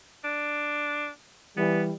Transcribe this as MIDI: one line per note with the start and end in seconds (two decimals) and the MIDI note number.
0.24 1.09 62
1.57 1.91 52
1.57 1.91 55
1.57 1.82 59